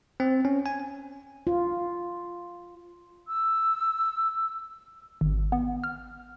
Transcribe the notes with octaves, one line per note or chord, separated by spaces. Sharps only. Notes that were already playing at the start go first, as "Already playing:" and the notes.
C4
C#4
G#5
F4
E6
G#1
B3
F6